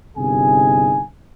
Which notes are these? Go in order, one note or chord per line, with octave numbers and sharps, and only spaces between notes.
G1 C3 D#4 G#4 G#5